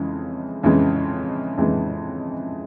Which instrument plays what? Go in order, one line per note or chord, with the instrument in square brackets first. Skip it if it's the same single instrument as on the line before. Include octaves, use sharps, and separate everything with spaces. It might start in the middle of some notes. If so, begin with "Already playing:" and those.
Already playing: [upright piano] F2 C#3 E3 G#3
F2 C#3 E3 G#3
F2 C#3 E3 G#3